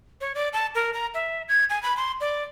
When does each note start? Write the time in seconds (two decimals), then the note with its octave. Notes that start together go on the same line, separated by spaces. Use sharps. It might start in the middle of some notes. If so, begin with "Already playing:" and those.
0.21 C#5
0.35 D5
0.53 A5
0.75 A#4
0.94 A#5
1.14 E5
1.48 G#6
1.70 G#5
1.83 B5
1.97 C6
2.21 D5